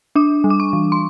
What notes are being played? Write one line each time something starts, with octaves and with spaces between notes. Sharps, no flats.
D4 D6
G3
D6
C#6
E3
C6